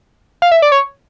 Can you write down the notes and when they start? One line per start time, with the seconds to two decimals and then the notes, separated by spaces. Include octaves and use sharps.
0.42 F5
0.52 E5
0.62 D5
0.72 C#5